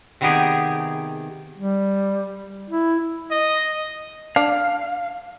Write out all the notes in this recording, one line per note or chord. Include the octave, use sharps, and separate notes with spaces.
C3 D#3 B3 D#4 G4 G#4
G3
E4
D#5
D4 F5